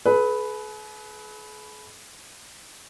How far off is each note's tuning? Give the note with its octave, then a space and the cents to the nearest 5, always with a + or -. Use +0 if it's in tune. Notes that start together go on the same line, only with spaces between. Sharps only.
G#4 +45 B4 +0